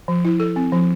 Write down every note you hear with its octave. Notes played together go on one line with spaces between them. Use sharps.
F3
E4
A4
C4
F3